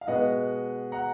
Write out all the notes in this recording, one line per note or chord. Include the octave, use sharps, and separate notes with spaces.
F5
B2 G#3 B3 D#5 F#5
F#5 A#5